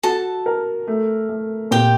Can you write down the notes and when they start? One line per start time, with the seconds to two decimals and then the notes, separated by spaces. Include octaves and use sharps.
0.03 F#4 A4 A5
0.46 A#4
0.88 A3
1.29 A3
1.71 A#2 G4 G5